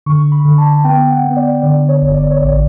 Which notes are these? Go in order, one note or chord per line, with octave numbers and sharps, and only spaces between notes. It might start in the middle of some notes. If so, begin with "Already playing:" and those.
D3 C#6
B5
D3
A5
B3 G5
F#5
B3
D5
D3 D5
C#5
G1
D5
C#5
A1 D5